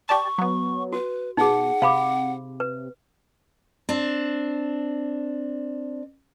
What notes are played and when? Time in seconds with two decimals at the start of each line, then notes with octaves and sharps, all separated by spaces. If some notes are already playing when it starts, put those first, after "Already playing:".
0.09 G4 D5 A5 C#6
0.38 F#3 B3
0.93 F#4 B4
1.37 B2 D#4 G#4 F#5
1.82 C3 F5 B5 D6
2.60 B4
3.89 C4 D4